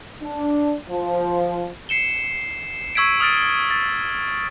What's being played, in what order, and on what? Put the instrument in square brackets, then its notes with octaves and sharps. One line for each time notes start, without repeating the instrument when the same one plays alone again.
[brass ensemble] D4
F3
[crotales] C7 C#7 E7 G7
C#6 E6 G#6 B6 D7
D#6 F6 A6 D7
A6